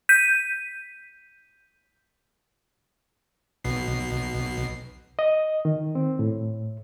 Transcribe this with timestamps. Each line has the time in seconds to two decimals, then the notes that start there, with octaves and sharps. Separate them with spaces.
0.09 G6 B6 D#7
3.64 B1 B2 C7
5.19 D#5
5.65 D#3
5.95 C4
6.19 A2